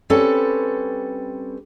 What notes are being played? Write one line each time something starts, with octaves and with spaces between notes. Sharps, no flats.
G3 C4 C#4 A4 B4